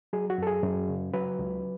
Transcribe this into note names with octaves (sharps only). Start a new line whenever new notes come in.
F#3 G#4
F#4
F#2 A4
G#4
F#2
C#3
F#3 B4
C#2